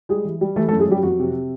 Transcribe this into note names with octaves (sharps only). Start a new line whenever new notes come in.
G3 G#3 G#4
E3
G3
E3 A3 A4
A3 A4
F#2
G#3 G#4
F#2 G3 G4
F2 F#3 F#4
C3